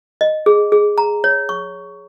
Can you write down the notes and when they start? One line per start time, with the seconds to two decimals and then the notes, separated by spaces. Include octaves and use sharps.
0.21 D#5
0.46 G#4
0.72 G#4
0.98 A#5
1.24 C#5
1.49 C#6